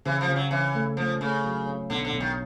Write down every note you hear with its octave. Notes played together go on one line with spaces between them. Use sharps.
C#3 E3
F3
C#3
F#3
E3 C#4
A3
F3 A3
C#3 A3
F#3
C#4
B1 D3
D3
B1
D#3